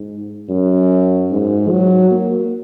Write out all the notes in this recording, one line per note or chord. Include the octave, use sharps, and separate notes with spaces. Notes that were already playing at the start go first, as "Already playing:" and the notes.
Already playing: G#2
F#2
G#2
F#3
A#3